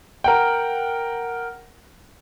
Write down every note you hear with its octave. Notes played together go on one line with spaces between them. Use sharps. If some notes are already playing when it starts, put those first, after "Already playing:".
A#4 F#5 G5